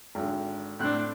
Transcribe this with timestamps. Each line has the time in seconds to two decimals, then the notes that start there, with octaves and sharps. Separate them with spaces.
0.15 G#1 D3
0.79 A2 C4 D4 F#6